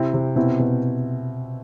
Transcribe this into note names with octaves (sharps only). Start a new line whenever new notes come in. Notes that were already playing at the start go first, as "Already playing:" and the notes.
Already playing: C3 C4 E4
C3
B2 C4 E4
B2